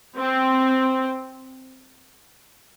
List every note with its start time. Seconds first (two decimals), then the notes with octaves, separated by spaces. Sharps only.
0.18 C4